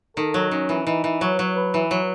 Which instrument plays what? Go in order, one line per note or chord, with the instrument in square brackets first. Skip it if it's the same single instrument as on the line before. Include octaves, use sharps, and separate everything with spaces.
[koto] D#3 [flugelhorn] A4
[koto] F#3
[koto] D#3 [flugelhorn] C#4
[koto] E3
[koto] E3 [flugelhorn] D#4
[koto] E3
[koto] F#3 [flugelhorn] C#5
[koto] F#3
[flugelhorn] B4
[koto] E3
F#3